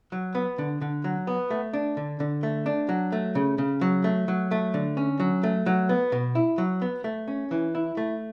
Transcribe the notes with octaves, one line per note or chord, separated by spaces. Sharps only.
F#3
B3
D3
D3
F#3
B3
A3
D4
D3
D3
A3
D4
F#3
A3
C#3
C#3
F#3
A3
F#3
A3
D3
C#4
F#3
A3
F#3
B3
B2
E4
F#3
B3
A3
C#4
E3
E4
A3